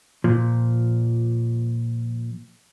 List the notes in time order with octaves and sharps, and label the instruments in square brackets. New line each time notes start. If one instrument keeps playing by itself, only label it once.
[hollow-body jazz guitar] A#2 F3